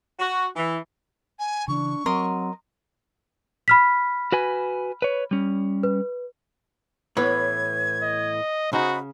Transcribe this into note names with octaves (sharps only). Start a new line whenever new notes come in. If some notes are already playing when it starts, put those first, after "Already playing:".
F#4
E3
G#5
C#3 E3 D4 C#6
F#3 C4 A#4 D#5 C6
B5 F6 B6
F#4 B4 G#5
B4 C#5
G3 C#4
B4
A2 E3 B3 B4 C#5 G#6
D#5
C#3 D#4 F#4 G#4 C5 B5